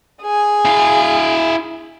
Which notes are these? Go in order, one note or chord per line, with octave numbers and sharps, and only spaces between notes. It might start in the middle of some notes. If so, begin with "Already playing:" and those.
G#4 G#5
E4 F5